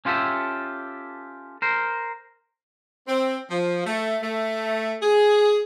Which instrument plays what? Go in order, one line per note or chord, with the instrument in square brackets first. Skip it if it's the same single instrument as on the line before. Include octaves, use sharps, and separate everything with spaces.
[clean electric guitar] C#4 F4 G4 A4 E5
A#4 C5
[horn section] C4
F3
A3
A3
G#4